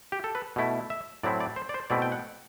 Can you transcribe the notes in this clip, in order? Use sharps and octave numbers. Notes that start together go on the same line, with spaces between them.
G4
A4
B4
B2 A3 E4
E5
A2 F#3 C4 E4 D5
D5
C5
D5
C5
B2 A3 C4 E4 D5
G5
F#5